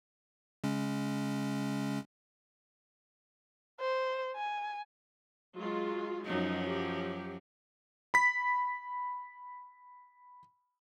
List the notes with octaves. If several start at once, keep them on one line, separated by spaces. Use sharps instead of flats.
C#3 G#3 C#4
C5
G#5
F#3 G#3 F4
F#2 F3 F#3 D#4
G4
B5 B6